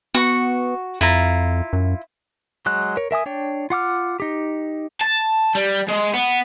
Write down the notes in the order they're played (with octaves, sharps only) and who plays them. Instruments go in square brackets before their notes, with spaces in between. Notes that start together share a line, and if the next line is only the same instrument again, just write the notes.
[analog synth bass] B3 [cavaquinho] F#4 C#6
[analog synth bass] F2 [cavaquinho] E4 F4 A#5
[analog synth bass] F#2
[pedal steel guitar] F#3 G#3 F#6
A#4 C#5
A#4 E5 G#5 D#6
D4 C#5 G5
F4 F#5 D6 F6
D#4 G4
[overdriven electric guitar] A5
G3
G#3
B3